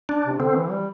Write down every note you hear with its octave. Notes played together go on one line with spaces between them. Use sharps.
D4
C3
D3 C4
E3
G3